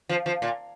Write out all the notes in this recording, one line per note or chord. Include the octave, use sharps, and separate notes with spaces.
F3
F3
A#2